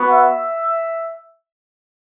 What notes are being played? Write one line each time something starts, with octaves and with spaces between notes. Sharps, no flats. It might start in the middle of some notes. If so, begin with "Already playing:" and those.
Already playing: B3 F#4
E5